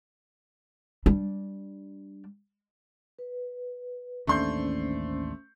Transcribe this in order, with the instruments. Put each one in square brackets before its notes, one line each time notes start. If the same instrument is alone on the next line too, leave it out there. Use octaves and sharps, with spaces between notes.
[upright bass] G3 D4
[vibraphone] B4
[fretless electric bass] A1 D#2 D4 [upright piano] A3 C6 G6 [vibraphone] C#4 C5